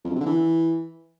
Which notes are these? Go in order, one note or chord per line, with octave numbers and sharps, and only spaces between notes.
F2
F#2
C3
D3
E3